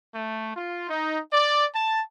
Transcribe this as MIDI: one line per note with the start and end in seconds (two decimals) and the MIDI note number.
0.15 0.51 57
0.55 0.86 65
0.89 1.20 63
1.32 1.66 74
1.74 2.00 81